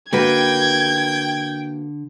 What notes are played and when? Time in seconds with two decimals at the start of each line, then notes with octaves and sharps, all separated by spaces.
0.13 D3 A#3 F#4 B4 G5 G#6